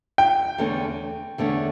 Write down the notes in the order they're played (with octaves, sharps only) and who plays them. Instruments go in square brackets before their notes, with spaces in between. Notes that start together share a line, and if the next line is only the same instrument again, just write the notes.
[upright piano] G5
[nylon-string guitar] E2 D3 A3 C#4
E2 D3 A3 C#4